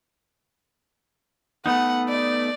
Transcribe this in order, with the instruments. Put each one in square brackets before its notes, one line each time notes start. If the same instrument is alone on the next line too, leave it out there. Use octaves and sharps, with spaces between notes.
[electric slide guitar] A3 B3 D#4 [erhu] F#5
[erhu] D5